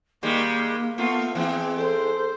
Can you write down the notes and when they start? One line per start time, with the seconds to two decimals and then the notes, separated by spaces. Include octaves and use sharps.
0.23 D#3 G3 G#3 A#3
0.98 A3 B3 F4
1.35 E3 G#3 C4
1.78 A4 C5